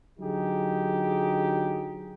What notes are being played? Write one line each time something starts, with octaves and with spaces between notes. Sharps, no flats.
D3 F#3 D#4 G4 G#4